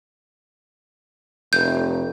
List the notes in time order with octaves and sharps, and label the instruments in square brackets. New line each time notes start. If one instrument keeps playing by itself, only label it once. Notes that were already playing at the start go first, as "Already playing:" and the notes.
[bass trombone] F1 [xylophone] G6